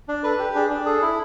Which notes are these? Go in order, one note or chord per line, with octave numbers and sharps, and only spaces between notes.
D4
A4 B4
G4
D4 G#4
D4
G#4 A4
E4